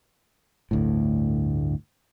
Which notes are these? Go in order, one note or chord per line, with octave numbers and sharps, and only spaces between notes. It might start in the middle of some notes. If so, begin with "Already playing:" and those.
G1 D2 A2